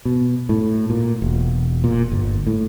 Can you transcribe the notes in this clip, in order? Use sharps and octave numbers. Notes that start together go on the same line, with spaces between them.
B2
A2
A#2
E1
A#2
G1
A2